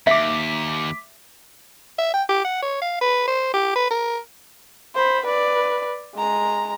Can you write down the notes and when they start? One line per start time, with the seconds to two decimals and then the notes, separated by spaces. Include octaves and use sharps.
0.07 D#2 E5 D6 B6
1.98 E5
2.14 G5
2.29 G4
2.45 F#5
2.62 C#5
2.81 F5
3.01 B4
3.27 C5
3.54 G4
3.76 B4
3.90 A#4
4.95 C5 B5
5.25 B4 D5
6.16 G#3 A#5